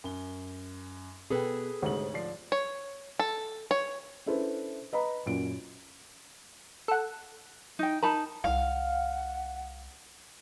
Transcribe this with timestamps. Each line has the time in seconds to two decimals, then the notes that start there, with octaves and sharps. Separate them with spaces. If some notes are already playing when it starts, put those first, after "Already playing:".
0.04 F#2 G7
1.30 B2 G#4 A4 B4 G5
1.82 D2 G#2 C3 C#5 F#7
2.14 F3 D5 C7
2.52 C#5
3.19 A4
3.71 C#5
4.26 C#4 D4 E4 A4 B4 C5
4.93 B4 D#5 A#5 B5
5.26 F#2 A#2 C#4 D7
6.88 A4 F#5
7.79 D#4 G5
8.03 D#4 A#4 A5 B5
8.44 C2 F5 F#5